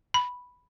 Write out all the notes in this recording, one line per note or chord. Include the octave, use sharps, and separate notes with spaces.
B5